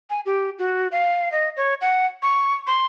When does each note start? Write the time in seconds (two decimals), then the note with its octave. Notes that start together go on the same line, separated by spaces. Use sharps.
0.10 G#5
0.26 G4
0.59 F#4
0.92 F5
1.32 D#5
1.57 C#5
1.81 F#5
2.23 C#6
2.67 C6